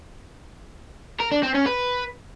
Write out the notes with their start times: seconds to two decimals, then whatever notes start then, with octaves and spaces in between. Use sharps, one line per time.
1.20 A#4
1.32 D4
1.43 C4
1.55 C#4
1.66 B4